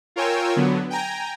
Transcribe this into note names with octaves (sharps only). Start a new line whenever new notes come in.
F4 A#4 C#5 G5 G#5 E6
D3 F#3 B3
G5 G#5 A#5